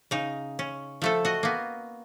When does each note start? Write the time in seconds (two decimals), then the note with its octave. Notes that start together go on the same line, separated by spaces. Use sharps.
0.11 C#3 D#4
0.59 C#4
1.02 F3 A3 A4
1.25 F#4 D#5
1.43 A#3 B3